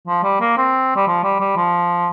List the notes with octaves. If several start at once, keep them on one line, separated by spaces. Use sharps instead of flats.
F3
G3
A#3
C4
G3
F3
G3
G3
F3